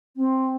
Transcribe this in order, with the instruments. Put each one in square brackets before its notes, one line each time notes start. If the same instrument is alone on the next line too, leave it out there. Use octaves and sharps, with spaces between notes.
[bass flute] C4